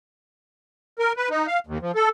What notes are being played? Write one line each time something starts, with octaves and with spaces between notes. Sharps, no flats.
A#4
B4
D#4
F5
D#2
F3
A4